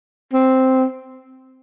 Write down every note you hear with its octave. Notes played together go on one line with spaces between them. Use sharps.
C4